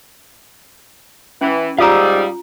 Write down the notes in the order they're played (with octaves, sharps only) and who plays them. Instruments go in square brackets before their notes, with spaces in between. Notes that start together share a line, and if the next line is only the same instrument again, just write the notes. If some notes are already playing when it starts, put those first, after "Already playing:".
[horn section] E3 [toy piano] C#4
[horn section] G#2 G3 [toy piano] F4 A#5 [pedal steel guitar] F5 D#6 E6